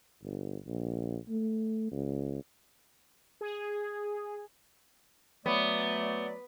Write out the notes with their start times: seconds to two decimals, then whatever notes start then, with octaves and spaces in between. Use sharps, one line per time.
0.22 G1
0.66 A#1
1.29 A3
1.92 C#2
3.41 G#4
5.46 F#3 A3 B3 D5